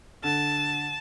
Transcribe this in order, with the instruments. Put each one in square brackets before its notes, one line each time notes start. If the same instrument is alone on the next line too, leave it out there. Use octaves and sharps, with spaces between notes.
[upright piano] D3 [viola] A5